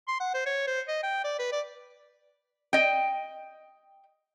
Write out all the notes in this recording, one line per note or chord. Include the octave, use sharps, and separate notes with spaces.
C6
F#5
C5
C#5
C5
D#5
G5
D5
B4
D5
D#5 G5